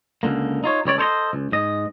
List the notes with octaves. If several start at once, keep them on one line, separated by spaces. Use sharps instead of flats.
C#2 D3 A#3
D#4 F4 C#5
C#2 G3 C#5 D5
A4 C5 C#5 D#5
C#2
G#2 D#5